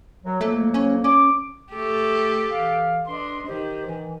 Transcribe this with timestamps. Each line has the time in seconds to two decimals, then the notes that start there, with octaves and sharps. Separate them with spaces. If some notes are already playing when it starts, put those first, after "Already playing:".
0.23 F#3
0.41 F2 F#3 A3 A#3
0.74 C#4
1.04 C#4 D6
1.72 A3 G4 A4
2.51 E3 F5
3.07 D4 B4 D#5 C6
3.47 D#3 G4 C5
3.85 E3